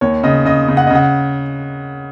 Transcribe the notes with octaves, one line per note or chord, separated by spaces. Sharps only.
D#2 C#5
C#3 D#5
C#3 D#5
C#3
F#5
C#3 D#5
F#5